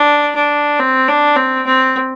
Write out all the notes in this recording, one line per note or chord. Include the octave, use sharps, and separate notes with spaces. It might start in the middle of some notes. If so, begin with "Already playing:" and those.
Already playing: D4
D4
C4
D4
C4
C4